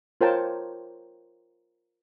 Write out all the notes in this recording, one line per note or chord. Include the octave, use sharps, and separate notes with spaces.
F4 A#4 C5 C#5 G5 A5